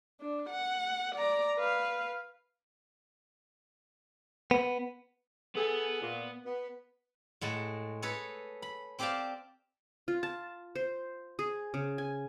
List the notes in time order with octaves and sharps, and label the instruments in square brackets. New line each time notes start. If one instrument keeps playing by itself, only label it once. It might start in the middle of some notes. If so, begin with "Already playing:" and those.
[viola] D4
F#5
D5 A#5
B4 F5
[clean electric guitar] B3
[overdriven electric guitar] B3 [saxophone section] G#4 A4
[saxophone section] A#2
B3
[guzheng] A2 G#3 F#5 A5
G#4 A4 B4 C#5
B5
C4 G4 C5 D5 F5 A5
[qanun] F4
A5
C5
G#4
C#3
G#5